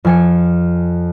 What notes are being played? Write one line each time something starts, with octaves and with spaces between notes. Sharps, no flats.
F2 G#5 C#7